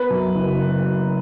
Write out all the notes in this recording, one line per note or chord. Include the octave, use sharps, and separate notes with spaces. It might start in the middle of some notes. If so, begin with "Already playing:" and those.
Already playing: B3 B4
F#2
F#1